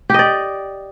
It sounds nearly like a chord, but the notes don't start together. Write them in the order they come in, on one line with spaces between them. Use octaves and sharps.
G4 D#5 D5